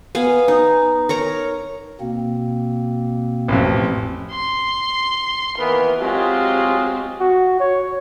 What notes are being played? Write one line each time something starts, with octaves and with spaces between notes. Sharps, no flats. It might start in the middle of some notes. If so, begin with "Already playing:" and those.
B3 F5 G#5
D#4
A#4 C#5 A#5
B2 A#3 C4
A1 F2
C6
D#2 E3 B3 A#4
F#3 G#3 C4 F4 G4
F#4
C#5